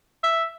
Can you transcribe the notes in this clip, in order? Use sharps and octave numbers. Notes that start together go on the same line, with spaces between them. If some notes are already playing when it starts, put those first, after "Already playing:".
E5